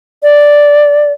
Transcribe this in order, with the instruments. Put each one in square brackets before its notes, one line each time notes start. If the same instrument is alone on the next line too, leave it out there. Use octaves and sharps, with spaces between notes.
[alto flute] D5